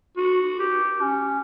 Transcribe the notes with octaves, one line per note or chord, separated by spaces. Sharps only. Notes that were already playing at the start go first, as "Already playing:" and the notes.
F#4
G4
C#4